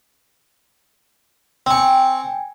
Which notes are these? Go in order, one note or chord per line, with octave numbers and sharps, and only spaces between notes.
C4 G5 G#5 C#6